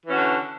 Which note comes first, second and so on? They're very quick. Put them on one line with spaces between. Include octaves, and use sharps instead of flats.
E3 C#4 F#4 D3